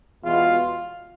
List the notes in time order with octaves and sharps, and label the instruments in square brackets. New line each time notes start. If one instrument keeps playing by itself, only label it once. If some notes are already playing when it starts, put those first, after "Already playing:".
[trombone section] E2 B2 G#3 F4